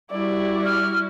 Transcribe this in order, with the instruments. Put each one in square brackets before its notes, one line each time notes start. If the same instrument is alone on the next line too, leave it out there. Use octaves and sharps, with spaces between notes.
[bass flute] G3 [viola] E4 F#4 [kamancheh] D5
[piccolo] F6